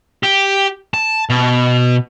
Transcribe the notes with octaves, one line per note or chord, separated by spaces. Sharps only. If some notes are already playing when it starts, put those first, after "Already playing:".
G4
A5
B2